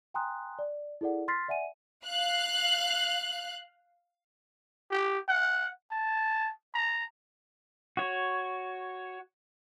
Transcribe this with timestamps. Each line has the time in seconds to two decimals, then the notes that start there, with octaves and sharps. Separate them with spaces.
0.14 G5 G#5 A#5 C6 D#6 F#6
0.59 D5
1.01 E4 G#4 A4 D5 F#5
1.28 C6 F6 A6 B6 C7
1.48 D5 E5 F#5 G#5 D#7
2.06 F5 F#6
4.91 G4
5.28 F#5
5.91 A5
6.75 A#5
7.97 F#4 C#5